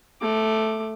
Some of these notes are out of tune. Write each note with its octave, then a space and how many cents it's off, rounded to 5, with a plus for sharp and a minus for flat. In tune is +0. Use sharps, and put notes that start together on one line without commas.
A3 +0 D6 +15